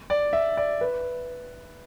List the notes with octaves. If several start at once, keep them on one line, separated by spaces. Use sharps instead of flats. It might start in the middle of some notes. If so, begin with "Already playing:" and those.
D5
E5
D5
B4